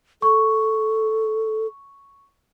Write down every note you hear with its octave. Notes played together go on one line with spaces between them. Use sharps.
A4 C#6